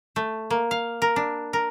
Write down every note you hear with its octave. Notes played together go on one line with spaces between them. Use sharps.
A3
A#3
F5
A#4
D4
A#4